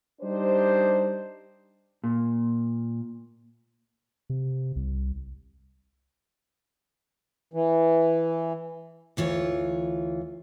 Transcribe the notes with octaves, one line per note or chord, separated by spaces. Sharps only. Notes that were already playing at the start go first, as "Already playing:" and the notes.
G3 D4 D#4 G4 C5
A#2
C3
C2
E3
D2 E3 F4 C#5